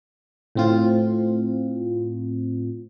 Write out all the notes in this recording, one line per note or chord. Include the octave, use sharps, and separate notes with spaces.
A2 C4 F4